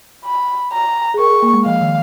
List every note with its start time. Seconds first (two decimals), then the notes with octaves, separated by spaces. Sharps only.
0.25 B5
0.72 A#5
1.14 G#4
1.19 A#4 C#6
1.30 G#4
1.43 A#3
1.54 G#3
1.65 F3 F5
1.81 D#3